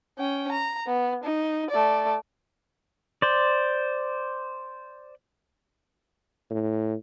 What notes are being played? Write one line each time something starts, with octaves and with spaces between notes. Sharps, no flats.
C#4 G5
A#5
B3
D#4
A3 D5
C5 D5
A2